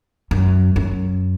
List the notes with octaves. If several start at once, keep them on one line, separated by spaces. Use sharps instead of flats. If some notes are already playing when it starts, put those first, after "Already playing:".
F#2
F#2